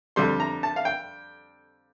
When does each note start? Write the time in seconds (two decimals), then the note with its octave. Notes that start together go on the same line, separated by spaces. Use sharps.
0.16 F2 D3 G3 C6
0.40 A#5
0.63 A5
0.76 F5
0.85 G5